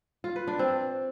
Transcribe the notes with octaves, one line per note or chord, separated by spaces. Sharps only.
F4
B4
D4
C4